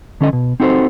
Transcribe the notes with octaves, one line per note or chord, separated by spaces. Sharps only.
D3 C#4 A4 D#5
B2
C4 D#4 F#4 A4 A#4 C5